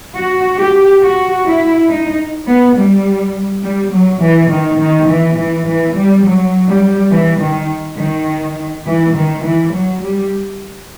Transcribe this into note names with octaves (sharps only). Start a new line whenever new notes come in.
F#4
G4
F#4
E4
D#4
B3
G3
G3
F#3
E3
D#3
D#3
E3
E3
E3
G3
F#3
G3
E3
D#3
D#3
E3
D#3
E3
F#3
G3